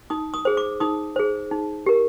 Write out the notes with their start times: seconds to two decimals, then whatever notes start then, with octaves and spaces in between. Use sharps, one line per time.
0.10 D#4 D#6
0.34 D#6
0.45 G#4 C5
0.57 D6
0.80 D#4 D#6
1.16 G#4 C5
1.51 D#4
1.86 G4 A#4